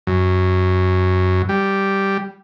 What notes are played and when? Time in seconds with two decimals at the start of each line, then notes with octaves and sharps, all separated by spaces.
0.07 F#2
1.49 G3